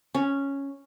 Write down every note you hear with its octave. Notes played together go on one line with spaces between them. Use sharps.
C#4